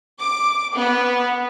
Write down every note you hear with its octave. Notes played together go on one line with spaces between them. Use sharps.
D6
B3